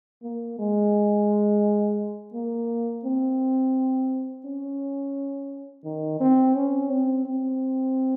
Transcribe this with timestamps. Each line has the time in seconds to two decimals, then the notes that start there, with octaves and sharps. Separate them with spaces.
0.23 A#3
0.59 G#3
2.34 A#3
3.05 C4
4.45 C#4
5.84 D#3
6.21 C4
6.55 C#4
6.90 C4
7.26 C4